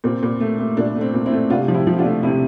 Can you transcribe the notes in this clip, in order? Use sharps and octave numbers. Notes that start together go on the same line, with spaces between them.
A#2 C4
A#2
A3
A3
A#2 D4
A3
C4
A#2
C4 E4
A3
C3 D4 F4
F3
E4 G4
F3
G4
D4 F4
A3
C3 C4 E4